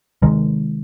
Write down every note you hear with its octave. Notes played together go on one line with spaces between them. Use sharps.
C3 D#3 G#3